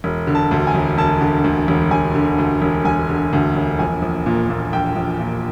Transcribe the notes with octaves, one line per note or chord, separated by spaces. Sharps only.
E1
D3
A5
D2
G#5
E1
E1 A5
D3
D2
E1
E1 G#5
D3
D2
E1
E1 G#5
D3
D2
E1
A#1 G#5
A#1
A#2
A#2
A#1 G5
A#1
A#2